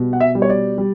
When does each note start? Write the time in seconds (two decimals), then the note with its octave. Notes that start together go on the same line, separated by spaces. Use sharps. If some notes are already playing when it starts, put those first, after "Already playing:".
Already playing: B2 G3
0.13 F#5
0.20 E5
0.35 G3
0.42 C#5
0.50 D5
0.78 G3